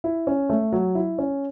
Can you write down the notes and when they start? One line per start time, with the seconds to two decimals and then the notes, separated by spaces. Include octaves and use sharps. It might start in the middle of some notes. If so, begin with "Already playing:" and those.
0.04 E4
0.27 C#4
0.50 A3
0.72 F#3
0.95 E4
1.18 C#4